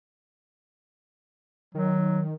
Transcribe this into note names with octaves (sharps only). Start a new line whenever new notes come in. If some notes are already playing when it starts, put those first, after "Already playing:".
D#3 F#3